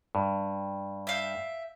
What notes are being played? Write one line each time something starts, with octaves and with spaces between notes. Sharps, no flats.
G2
E5 F5 G5